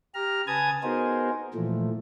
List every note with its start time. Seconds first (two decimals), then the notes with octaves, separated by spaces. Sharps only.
0.14 G4 A#5 F6
0.47 C#3 B4 G#5 A5 D#6 G#6
0.83 B3 D#4 F#4 G#4 A#4 C5
1.54 A#2 E3 F3 A3